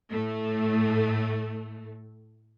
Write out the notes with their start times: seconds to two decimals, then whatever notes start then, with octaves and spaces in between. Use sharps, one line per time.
0.10 A2 A3